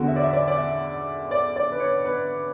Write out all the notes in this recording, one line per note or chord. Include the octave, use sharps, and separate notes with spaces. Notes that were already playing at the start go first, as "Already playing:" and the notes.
Already playing: E2 D3 F#4
E5
D5
E5
D5
D5
E5
D5
D5
B4
C#5
B4